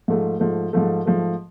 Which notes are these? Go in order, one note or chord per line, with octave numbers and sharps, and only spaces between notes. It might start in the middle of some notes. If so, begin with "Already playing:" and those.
G#2 F3 A3
G#2 F3 A3
G#2 F3 A3
G#2 F3 A3